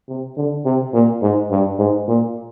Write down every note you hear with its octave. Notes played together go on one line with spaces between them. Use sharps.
C3
D3
C3
A#2
G#2
G2
G#2
A#2